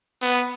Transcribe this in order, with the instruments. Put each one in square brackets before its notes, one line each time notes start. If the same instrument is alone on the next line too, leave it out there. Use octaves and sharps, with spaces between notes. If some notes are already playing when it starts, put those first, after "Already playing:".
[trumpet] B3